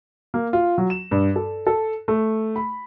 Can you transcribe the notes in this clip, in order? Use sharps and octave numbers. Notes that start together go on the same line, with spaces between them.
A#3
F4
F#3
E7
G2
A4
A4
A3
B5